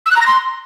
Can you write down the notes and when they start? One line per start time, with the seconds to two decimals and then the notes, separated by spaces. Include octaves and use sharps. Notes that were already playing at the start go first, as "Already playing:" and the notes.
0.06 E6
0.11 F#6
0.16 A#5
0.21 A#6
0.26 C6